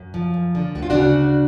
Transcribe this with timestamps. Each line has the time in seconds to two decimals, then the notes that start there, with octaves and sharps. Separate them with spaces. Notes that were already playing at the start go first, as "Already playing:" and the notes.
Already playing: F#2
0.14 F3
0.34 F#2
0.55 D3
0.75 D2 F#4
0.83 F4
0.90 C#3 D4 F#4
1.16 D2